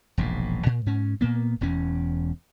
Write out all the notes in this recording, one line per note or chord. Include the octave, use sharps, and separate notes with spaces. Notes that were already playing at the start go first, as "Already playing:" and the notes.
E1 A#1 G#2
A#2
G#2 C#4
A#2 A#3 B3
E1 E2 C#4